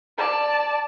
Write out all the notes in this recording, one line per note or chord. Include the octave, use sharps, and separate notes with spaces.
D5 A5